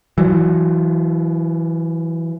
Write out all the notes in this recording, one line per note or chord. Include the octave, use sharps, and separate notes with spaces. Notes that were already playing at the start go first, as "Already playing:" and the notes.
E3 F#3